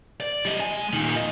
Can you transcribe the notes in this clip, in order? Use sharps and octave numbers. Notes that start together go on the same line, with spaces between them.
D5
G3 D#5
G#3 G#5
A#2 D#3
F2 D#5